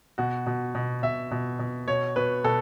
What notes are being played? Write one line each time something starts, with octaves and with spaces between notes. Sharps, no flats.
B2 F#4
B2
B2
B2 E5
B2
B2
B2 C#5
B2 B4
B2 A4